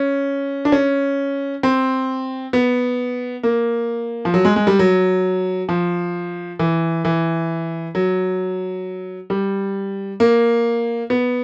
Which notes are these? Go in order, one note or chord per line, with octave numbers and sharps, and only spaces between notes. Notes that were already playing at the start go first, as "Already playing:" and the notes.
Already playing: C#4
D4
C#4
C4
B3
A#3
F3
F#3
G#3
G#3
G3
F#3
F3
E3
E3
F#3
G3
A#3
B3